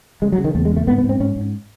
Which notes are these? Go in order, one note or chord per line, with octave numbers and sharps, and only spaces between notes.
C#3 G#3
F#3
C#3
D#3
E2 A3
G#3
C#3
A3
G#2 B3
B3
G#2
C4
G#2 C#4
G#2